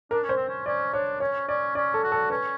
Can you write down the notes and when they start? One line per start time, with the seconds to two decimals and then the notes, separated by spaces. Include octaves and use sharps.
0.11 D4 A#4
0.23 C#4
0.29 C5
0.36 C4
0.48 C#4
0.66 C#4 D5
0.93 D4 C#5
1.20 C#4 C#5
1.48 C#4 D5
1.75 C#4 D5
1.94 A4
2.04 F#4
2.12 A4
2.30 C#4 B4